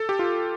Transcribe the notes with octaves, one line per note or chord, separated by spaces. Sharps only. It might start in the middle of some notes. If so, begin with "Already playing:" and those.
Already playing: A4
G4
F4